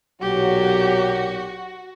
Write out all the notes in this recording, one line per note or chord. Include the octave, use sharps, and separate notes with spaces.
B1 A#2 F#3 F#4 G4